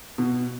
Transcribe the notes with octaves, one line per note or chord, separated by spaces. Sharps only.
B2